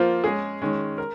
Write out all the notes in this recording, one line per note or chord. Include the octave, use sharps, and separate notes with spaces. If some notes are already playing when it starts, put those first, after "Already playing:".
Already playing: F3 A#3 F4 C5
G#3 C#4 G#4
D#3 G#3 C#4
A#4